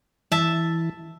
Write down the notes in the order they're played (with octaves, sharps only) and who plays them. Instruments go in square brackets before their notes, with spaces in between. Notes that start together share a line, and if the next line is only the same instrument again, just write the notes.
[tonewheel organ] E3 [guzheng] E5 A5